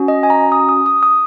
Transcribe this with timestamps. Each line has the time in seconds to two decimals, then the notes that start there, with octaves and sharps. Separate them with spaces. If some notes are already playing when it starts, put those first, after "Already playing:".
Already playing: C#4 F#4
0.08 D#5
0.23 G#5
0.30 A#5
0.52 D#6
0.69 D#6
0.86 D#6
1.03 D#6